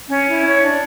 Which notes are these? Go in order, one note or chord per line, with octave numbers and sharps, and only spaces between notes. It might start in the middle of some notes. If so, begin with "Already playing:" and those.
C#4
E4
C#5
D4